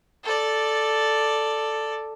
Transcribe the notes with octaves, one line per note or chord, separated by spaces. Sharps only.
A4 D5